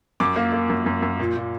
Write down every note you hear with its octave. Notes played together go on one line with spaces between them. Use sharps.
F#2 D6
A#3
A#3
F#2
F#2
F#2
A#2
A#2